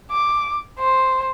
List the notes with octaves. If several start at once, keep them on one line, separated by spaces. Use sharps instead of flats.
D6
C5